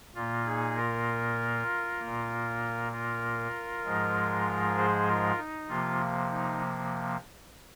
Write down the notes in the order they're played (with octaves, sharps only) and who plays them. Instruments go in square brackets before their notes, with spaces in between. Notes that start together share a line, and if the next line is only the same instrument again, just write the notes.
[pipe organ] A#2 A#3 F4
D#4 G#4
F4 A#4
A#3
A#2
F4 A#4
G#2 F3 G#3
G#4 C5
F4 A#4
D#4
C3 F3 A#3 F4
D#4